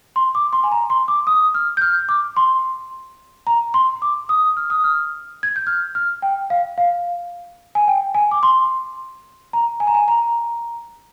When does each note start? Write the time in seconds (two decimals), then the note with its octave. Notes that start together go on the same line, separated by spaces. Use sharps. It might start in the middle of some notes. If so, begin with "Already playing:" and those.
0.16 C6
0.35 D6
0.53 C6
0.63 G#5
0.72 A#5
0.90 C6
1.08 D6
1.27 D#6
1.55 F6
1.77 G6
1.82 F6
2.09 D6
2.37 C6
3.47 A#5
3.74 C6
4.02 D6
4.29 D#6
4.57 F6
4.70 D#6
4.84 F6
5.43 G#6
5.56 G6
5.67 F6
5.95 F6
6.22 G5
6.50 F5
6.78 F5
7.75 G#5
7.88 G5
8.14 G#5
8.31 D6
8.43 C6
9.53 A#5
9.80 G#5
9.87 A#5
9.95 G#5
10.08 A#5